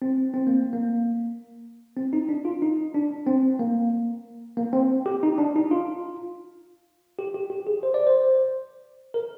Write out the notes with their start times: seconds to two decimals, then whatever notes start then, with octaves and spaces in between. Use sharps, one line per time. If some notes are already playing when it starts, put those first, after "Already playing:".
0.02 C4
0.34 C4
0.47 A#3
0.73 A#3
1.97 C4
2.13 D#4
2.29 D4
2.45 F4
2.62 D#4
2.94 D4
3.27 C4
3.59 A#3
4.57 A#3
4.73 C4
5.06 G4
5.23 D#4
5.38 D4
5.56 D#4
5.71 F4
7.19 G4
7.34 G4
7.50 G4
7.67 G#4
7.83 C5
7.94 D5
8.07 C5
9.14 A#4